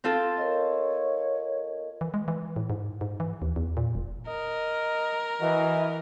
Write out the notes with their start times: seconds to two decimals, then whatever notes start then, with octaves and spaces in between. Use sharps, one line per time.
0.04 C4 F4 A4
0.38 A#4 C#5 D#5
2.01 E3
2.14 G#3
2.28 E3
2.56 A2
2.70 G#2
3.01 G#2
3.20 E3
3.42 D#2
3.56 E2
3.77 A#2
3.95 E1
4.28 A#4 D#5
5.41 E3 F#4 D#5